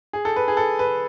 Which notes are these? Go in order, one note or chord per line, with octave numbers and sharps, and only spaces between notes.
G#4
A4
B4
G#4
A4
B4